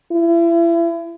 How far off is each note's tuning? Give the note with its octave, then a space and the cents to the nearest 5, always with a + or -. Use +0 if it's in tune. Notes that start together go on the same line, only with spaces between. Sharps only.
E4 +35